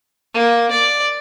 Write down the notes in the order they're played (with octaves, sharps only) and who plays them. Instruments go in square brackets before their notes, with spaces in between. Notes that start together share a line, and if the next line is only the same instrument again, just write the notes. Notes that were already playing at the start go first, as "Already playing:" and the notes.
[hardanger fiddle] A#3
D5